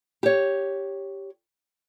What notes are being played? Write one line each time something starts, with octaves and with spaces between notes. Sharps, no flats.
G4 C#5